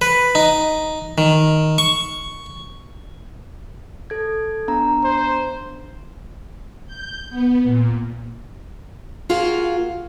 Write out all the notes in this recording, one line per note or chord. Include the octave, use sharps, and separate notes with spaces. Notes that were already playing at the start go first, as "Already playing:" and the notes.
B4
D#4
D#3
C#6
A4 G#6
B3 D4 A#5
C5
G6
B3
A#2
A#3 F4 F#4 G#4 F5